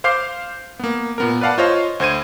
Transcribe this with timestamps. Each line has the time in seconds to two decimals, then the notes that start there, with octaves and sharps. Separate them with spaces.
0.04 C5 F5 D6 G6 C7
0.79 A#3 B3
1.18 A#2 B3 A#4
1.41 B4 D5 F5 F#5 A5
1.58 F4 C5 C#5 D#5 F5
2.00 D2 C5 G#6 D#7